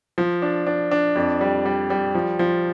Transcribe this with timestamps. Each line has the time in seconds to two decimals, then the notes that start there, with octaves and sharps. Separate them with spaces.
0.18 F3
0.42 D4
0.67 D4
0.91 D4
1.16 F2
1.41 G3
1.65 G3
1.90 G3
2.15 F3
2.39 F3